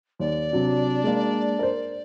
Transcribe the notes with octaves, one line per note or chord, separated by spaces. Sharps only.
D#2 D5
C3 F#3 D4
G#3 A#3
A#4 C5